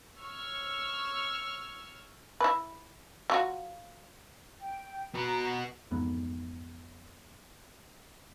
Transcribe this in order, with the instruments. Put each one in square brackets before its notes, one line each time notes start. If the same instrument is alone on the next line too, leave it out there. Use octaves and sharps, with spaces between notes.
[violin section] C#5 C#6 E6 F6
[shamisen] E4 B4
F#3 F4 F#4
[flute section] G5
[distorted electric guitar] B3 F#4 [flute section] A#5
[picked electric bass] A1 F2 G#2 B3